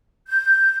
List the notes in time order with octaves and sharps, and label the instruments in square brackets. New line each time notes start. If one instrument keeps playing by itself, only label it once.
[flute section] G6